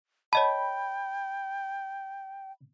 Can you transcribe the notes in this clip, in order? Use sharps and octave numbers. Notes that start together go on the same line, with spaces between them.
C#5 D#5 G5 A5 B5